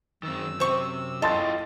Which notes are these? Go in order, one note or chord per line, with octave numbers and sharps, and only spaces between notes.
F#2 D#3 C4 E6
C3 C4 C5 C#6
E4 F4 A4 D#5 G5 C6 A6